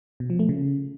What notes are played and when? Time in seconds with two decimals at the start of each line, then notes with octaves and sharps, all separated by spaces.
0.20 B2
0.30 F3
0.39 A3
0.49 C#3